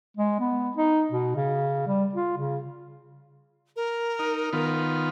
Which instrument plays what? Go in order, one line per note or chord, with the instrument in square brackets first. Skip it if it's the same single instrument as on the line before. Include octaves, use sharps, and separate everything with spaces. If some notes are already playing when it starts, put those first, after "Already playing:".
[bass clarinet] G#3
B3
D#4
B2
C#3
G3
F4
C#3
[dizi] A#4
[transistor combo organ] D#4
D#3 B3 F4